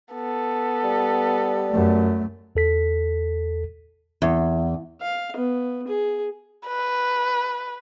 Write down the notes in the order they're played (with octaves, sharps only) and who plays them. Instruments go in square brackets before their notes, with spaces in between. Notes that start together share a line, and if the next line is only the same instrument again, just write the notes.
[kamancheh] B3 A4
[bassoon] G3
[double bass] F#2 A3
[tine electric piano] E2 A4 B6
[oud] E2
[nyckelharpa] F5
B3
G#4
[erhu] B4